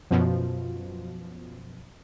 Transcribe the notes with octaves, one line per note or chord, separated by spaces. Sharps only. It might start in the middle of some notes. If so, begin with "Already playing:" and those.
F#2 B2 F3